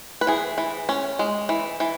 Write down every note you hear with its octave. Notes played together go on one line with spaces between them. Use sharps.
B4
E3 G#4
E3
C#4
G#3
E3
E3